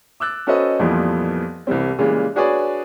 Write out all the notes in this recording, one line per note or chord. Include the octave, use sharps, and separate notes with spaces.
D6 E6 F#6 A6
C#4 F#4 A4 B4 C5 D#5
F2 A#2 E3 F3 G3 B3
C2 E3 G3 C4
A#2 C#3 E3 G3 G#3
D4 F#4 G#4 B4 C#5 D5